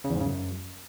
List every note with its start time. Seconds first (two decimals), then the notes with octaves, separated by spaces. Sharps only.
0.04 C#3
0.10 E2
0.15 G#2
0.20 C#3
0.26 F#2